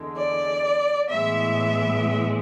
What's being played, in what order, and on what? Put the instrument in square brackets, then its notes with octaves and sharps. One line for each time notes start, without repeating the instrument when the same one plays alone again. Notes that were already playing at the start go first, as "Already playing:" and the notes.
Already playing: [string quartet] E2 D3 G#3
D5
A2 E3 G#3 B3 E5